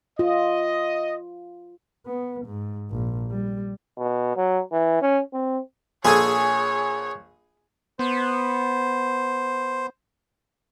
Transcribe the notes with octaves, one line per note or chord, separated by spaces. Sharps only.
F4 D#5
B3
G#2
A#1
G3
B2
F#3
E3
C#4
C4
A#1 G#4 A4 C#5 G#5
B3 C5